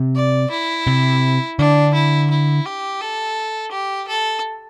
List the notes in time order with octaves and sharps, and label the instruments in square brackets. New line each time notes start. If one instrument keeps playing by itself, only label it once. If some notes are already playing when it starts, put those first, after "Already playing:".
Already playing: [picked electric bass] C3
[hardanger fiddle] D5
E4
[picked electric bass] C3
[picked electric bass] D3 [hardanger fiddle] D4
[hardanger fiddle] E4
E4
G4
A4
G4
A4